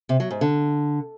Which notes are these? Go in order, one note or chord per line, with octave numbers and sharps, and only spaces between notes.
C3
F#3
G#2
D3